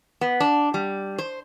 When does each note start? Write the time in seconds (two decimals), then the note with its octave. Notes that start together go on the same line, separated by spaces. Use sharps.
0.21 B3
0.40 D4
0.74 G3
1.18 C5